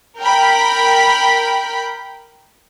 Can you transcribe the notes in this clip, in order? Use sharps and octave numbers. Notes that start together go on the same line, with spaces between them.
A#4 G5 B5